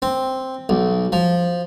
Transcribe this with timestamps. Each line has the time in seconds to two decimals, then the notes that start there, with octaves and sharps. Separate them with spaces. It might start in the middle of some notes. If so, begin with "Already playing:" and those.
0.02 C4
0.69 B1
1.12 F3